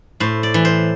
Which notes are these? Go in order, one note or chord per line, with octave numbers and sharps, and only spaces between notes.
A2 C5
D5
E3
C5